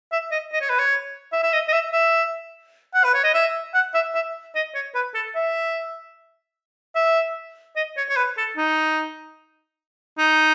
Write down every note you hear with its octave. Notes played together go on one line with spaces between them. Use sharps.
E5
D#5
D#5
C#5
B4
C#5
E5
E5
D#5
D#5
E5
E5
F#5
B4
C#5
D#5
E5
F#5
E5
E5
D#5
C#5
B4
A4
E5
E5
D#5
C#5
C#5
B4
A4
D#4
D#4